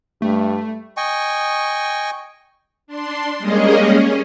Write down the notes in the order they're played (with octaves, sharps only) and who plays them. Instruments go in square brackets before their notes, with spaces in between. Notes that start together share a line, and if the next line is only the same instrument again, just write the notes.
[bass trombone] G2 [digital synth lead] A3
[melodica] D#5 G5 G#5 C#6
[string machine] D4 C6
G3 G#3 A#3 C#4 G#4 D#5
C#4